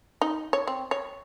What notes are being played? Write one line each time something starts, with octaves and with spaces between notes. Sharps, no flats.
D#4
C#5
C4
C#5